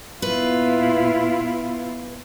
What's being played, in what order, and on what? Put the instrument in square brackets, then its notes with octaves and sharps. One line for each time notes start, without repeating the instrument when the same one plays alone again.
[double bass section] A#2 B3 [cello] E4 F4 [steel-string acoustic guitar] B4